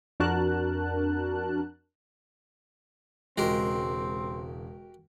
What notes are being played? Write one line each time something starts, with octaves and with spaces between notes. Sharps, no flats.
F2 D4 F#4 A#4 A5 F#6
E1 C#3 G#3 C4 F#4 G4 A#4